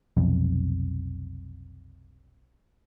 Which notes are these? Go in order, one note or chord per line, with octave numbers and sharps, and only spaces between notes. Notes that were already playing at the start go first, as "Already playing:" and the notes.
F1 B1 F2